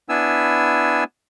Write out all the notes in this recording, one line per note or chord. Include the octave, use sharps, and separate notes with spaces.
B3 D4 E4 G#5 E6